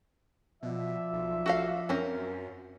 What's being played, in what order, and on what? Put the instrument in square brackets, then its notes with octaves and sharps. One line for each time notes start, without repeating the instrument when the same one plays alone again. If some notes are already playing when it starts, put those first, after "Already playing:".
[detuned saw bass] B2 [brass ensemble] F3 D5 E5
[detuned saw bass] B1
[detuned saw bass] A1 [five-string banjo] F#4 A4 F5
[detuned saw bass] F#2 [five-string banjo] C4 C#4 A#4